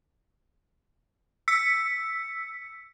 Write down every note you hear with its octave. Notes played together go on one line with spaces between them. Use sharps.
E6 B6 C#7